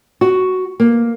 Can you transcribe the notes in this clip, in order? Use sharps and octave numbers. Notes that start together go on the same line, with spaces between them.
F#4
A#3